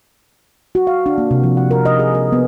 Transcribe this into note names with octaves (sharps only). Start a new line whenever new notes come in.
F#4
F5
D4
A#3
C3
F3
F#5
A#4
D#5
G#4
A#4
B3